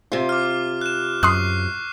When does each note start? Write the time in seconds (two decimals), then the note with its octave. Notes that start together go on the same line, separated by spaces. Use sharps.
0.12 C3 F4
0.29 D6 F6
0.81 F#6 E7
1.23 F#2 C6 C#6 D#6 F#6 C7